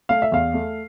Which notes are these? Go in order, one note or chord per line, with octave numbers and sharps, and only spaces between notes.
A3 F5
E5
E2 F5
A3